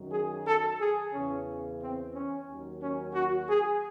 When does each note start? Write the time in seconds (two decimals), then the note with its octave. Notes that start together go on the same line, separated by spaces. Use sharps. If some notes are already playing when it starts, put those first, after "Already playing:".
Already playing: F#2 D#3 F#3
0.11 G#4
0.45 A4
0.78 G#4
1.12 E2 C#3 E3 C#4
1.80 C4
2.13 C#4
2.47 D#2 D#3 F#3
2.81 C#4
3.14 F#4
3.48 G#4